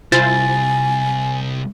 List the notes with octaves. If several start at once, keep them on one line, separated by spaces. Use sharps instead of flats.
C2 E4 F4 C5 G#5 A6